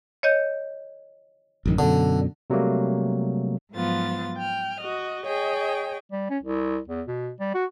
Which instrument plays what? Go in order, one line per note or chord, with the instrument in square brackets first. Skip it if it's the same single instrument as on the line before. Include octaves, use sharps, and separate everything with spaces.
[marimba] C#5 D#5 G6
[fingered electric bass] A1 F#2 D#3
[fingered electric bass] F#2 B2 [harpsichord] D3
[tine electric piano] C3 F#3 G3 A3 A#3
[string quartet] G#2 F3 F#3 B3 F4 A6
G5 F6
F#4 D#5
G#4 C#5 D#5 G5
[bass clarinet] G3
C#4
C2
E2
B2
G3
F#4